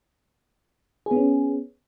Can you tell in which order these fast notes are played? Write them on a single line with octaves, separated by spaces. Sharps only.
G#4 B3 C#4